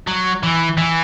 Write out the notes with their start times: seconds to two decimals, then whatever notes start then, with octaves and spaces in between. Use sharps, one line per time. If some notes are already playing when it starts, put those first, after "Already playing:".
0.08 F#3
0.43 E3
0.78 E3